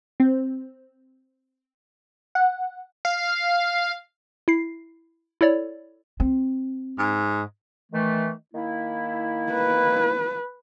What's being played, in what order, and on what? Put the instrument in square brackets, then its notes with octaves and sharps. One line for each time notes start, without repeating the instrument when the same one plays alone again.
[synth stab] C4
F#5
[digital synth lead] F5
[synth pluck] E4 C7
E4 A4 C#5 D5
[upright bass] C4
[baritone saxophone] G#2
[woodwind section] D#3 E3 A3
D#3 A#3 E4
[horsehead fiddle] B4